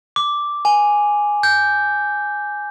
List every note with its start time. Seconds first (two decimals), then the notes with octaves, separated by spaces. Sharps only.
0.16 D6
0.65 G#5
1.43 G6